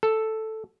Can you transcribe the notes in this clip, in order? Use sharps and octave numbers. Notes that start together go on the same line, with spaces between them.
A4